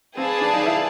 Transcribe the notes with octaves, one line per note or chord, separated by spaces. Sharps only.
C4 G#4 B4 D5 F5 A5
D4
D#4
E4